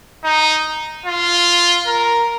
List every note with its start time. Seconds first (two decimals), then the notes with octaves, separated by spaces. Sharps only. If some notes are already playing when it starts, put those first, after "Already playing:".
0.24 D#4
1.06 F4
1.87 A#4